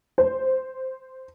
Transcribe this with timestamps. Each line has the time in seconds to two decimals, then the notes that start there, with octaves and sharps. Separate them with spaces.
0.18 C5